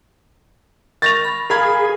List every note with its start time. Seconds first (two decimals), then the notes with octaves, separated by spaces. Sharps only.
1.02 A#4 C#6 A6 A#6 F7
1.24 B5
1.50 G#4 A#4 F5 B5 G#6